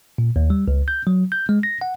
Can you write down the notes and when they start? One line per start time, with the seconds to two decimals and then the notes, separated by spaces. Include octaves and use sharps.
0.18 A#2
0.36 D#2
0.50 G3
0.68 C#2
0.88 G6
1.07 F#3
1.32 G6
1.49 G#3
1.63 A#6
1.81 F#5